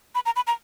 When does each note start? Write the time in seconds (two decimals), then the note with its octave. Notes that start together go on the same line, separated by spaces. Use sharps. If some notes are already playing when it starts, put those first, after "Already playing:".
0.15 B5
0.26 A#5
0.36 B5
0.47 A#5